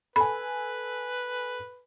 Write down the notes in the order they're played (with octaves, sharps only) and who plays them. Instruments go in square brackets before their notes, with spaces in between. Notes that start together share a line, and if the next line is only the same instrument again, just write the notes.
[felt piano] A4 G#5 [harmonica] B4 [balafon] B5